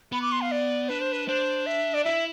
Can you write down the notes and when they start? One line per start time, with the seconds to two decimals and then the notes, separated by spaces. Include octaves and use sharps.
0.12 B3 B5
0.22 D6
0.32 C6
0.41 F5
0.52 D5
0.89 D4 B4
1.01 C5
1.12 B4
1.27 D4 C5
1.66 E5
1.94 D5
2.04 E4 E5